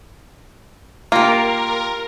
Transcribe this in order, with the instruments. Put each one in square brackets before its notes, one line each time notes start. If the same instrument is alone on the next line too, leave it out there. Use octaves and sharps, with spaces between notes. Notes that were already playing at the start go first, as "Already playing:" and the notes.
[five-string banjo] A#3 [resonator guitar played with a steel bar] F4 G4 [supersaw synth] A#4